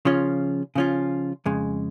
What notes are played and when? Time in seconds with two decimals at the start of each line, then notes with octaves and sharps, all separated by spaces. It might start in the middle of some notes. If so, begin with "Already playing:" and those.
0.05 C#3 F3 C#4 F4
0.75 C#3 F3 C#4 F4
1.46 F2 C#3 G#3